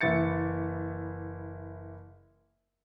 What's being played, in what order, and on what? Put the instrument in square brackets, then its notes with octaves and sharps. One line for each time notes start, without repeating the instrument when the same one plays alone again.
[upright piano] F#1 E3 E4 A6 C#7